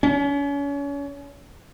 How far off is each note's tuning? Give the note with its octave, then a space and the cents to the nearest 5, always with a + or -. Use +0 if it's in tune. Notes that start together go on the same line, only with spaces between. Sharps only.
C#4 +35